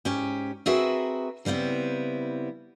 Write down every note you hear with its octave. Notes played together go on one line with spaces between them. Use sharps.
G#2 C#4 G4
C4 F#4 G#4 A#4 B4 E5
C#3 G3 B3 C4 E4